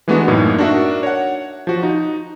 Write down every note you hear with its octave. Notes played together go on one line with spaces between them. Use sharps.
E3 G#3 A3 B3 D4 F#4
F#2 A2 A#3 D#4
D4 D#4 F#4 A#4 E5
C#5 F#5
F3 F#4
D#4